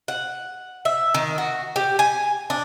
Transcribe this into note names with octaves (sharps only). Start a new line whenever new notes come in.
F#5
E5
D#3
F#4
G4
G#5
D4